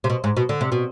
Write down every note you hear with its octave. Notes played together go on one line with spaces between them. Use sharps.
C3
B2
G#2
B2
D3
C3
B2